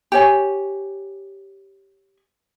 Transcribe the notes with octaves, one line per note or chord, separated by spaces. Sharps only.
G4 C#5 G#5